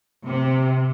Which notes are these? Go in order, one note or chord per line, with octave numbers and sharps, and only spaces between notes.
C3